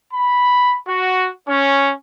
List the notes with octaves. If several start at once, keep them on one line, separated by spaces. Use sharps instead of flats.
B5
F#4
C#4